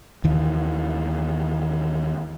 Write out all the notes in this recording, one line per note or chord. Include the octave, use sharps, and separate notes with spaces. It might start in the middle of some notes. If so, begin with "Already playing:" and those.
D#2 D#3 E3